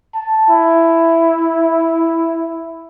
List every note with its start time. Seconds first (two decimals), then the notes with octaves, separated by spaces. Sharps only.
0.14 A5
0.48 E4